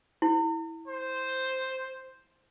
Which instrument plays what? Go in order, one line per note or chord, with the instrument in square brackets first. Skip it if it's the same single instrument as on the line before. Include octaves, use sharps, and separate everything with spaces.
[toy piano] E4
[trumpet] C5